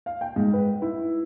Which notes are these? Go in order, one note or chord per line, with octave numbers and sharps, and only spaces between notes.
F5
G5
G#2
B4
E4